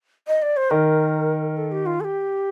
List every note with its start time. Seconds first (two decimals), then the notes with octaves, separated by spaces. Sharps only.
0.28 D#5
0.42 D5
0.57 C5
0.70 D#3 A#4
1.57 A4
1.71 G4
1.86 F4
2.00 A4
2.04 G4